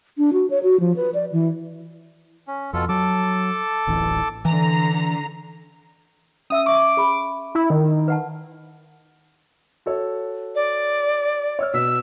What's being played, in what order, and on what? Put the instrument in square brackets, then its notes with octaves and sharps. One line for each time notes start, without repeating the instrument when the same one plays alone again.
[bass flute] D4
F#4
C#5
F#4
F3
B4
D5
E3
[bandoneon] C#4
[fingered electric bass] F2 [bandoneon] B2 F4 A4
[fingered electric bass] F#3 [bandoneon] A4 A5 D6
[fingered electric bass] D1 A1 E3
[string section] D3 A#5 [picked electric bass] E3
[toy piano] C#4 E5 E6 [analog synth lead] D#6
[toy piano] E5 C#6 [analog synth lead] D6
[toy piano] G#4 B5
[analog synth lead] E4
D#3
[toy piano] B4 F#5 A5
[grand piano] F#4 A4 C#5
[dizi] D5
[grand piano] C#5 E6 F6
[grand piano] B2 B6 [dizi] E6